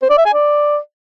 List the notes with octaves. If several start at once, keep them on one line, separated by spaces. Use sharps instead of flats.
C5
D5
E5
G#5
D5